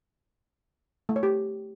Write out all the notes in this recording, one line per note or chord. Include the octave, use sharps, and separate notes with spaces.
A3
C#5
G4